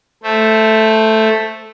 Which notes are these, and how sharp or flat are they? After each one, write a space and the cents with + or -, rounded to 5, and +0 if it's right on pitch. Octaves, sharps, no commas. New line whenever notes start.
A3 +0 C5 +0